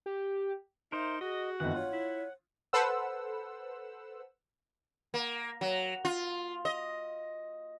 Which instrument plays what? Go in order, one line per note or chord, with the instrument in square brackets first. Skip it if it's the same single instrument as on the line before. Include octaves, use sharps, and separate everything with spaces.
[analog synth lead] G4
[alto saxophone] D#4 [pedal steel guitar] A#4 C5 [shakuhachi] E5
[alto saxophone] F#4 [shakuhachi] G#4 [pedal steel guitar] D#5
[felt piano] G1 D#3 E3 [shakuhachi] C4 [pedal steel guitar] F#5
[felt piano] F4 [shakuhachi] C#5
[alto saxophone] E4
[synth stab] A4 B4 C5 F#5 E6
[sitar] A#3
F#3
F4
D#5